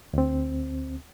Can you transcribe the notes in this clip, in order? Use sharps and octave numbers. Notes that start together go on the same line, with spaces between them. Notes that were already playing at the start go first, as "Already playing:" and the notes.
D2 C4